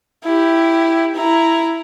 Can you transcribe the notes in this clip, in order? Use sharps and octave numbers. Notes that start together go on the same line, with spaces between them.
E4 G4
E4 A#5